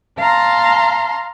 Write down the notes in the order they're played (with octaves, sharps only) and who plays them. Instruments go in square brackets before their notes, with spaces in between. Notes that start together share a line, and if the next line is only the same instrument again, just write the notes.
[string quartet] F5 A5 A#5 C6